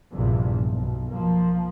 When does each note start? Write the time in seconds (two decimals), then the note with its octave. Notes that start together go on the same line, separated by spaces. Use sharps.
0.12 A#1 E2 G2 C3 F3
0.72 B1
1.10 F3 A#3